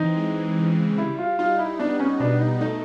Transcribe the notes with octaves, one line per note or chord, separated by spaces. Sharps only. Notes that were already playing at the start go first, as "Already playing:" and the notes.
Already playing: E3 C4 D#4
G#3
C#3
G3 E4
F4
D#4 F4
E4
B3 D4
C#4
B2 D4
D#4
A3 D#4